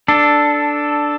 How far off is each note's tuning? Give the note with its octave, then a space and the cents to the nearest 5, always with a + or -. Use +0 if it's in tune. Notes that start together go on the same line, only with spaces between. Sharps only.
D4 +0 A4 +0